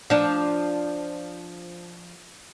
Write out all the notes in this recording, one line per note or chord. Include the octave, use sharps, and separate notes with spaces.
F3 D4